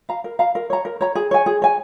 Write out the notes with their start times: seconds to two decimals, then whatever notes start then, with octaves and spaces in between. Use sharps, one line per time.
0.09 F5 A#5
0.24 A#4
0.39 F5 A#5
0.55 A#4
0.70 C#5 A#5
0.85 A#4
1.01 C#5 A#5
1.15 G#4
1.31 C#5 G#5
1.46 G#4
1.62 C#5 G#5